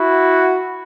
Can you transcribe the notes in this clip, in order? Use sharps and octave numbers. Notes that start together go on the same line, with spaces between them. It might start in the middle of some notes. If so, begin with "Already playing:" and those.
Already playing: E4 F#4